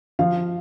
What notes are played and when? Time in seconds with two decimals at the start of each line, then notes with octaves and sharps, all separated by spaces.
0.19 F3 F5